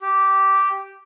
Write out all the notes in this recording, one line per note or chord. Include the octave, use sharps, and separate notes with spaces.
G4